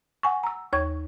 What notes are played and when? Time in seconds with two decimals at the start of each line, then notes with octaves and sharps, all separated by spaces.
0.23 F#5 G#5 C#6
0.43 A#5 E6
0.73 D#2 C#5 C#6 G#6